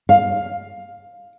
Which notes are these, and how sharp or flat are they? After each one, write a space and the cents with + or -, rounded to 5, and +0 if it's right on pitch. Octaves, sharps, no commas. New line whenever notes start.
F5 +10